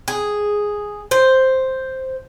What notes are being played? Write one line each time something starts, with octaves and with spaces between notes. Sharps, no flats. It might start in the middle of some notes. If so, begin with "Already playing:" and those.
G#4
C5